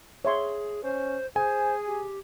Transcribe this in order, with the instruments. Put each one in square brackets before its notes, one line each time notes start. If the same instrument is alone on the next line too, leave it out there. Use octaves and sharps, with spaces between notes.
[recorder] G#4 [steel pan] C#5 E5 C6
[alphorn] C#4 [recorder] C5
[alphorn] G#4 [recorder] C5 [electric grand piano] G#5
[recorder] G4